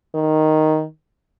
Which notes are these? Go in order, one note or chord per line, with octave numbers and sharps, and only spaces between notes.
D#3